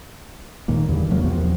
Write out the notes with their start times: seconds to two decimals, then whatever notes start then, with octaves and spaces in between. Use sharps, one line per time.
0.68 D#2 A#2 D#3 A#3
0.89 E2 G2 D3 E3
1.10 C3 F3 F#3 A#3
1.24 E2 C3 F3 B3